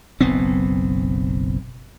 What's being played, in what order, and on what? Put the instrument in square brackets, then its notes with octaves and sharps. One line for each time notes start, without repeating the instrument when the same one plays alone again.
[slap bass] F#1 B1 B3 C4